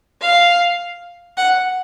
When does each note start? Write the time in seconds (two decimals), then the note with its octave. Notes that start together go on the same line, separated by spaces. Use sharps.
0.21 F5
1.37 F#5